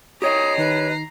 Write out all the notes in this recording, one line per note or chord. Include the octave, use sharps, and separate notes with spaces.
G4 C#5 D#5 A#5 D#6 C7
D#3 D#4 B4